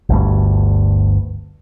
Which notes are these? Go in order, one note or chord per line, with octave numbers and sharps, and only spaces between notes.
G1 D2 G2